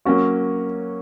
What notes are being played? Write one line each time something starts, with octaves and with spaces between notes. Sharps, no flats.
F#3 A#3 C#4 F#4